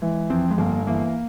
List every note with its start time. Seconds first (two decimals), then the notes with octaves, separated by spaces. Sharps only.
0.02 E3 G#3
0.30 F2 C4
0.50 G#3
0.58 G1 A#3
0.87 E3 A#3